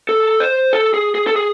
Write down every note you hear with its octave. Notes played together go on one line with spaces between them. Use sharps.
A4
C5
A4
G#4
G#4
A4
G#4